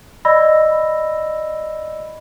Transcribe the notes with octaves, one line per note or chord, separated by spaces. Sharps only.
D5 D#5 B5 E6 A#6